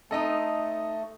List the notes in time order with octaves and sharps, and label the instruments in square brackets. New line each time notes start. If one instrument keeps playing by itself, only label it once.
[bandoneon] A3 [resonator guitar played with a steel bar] C4 D#4 [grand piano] A4 D#5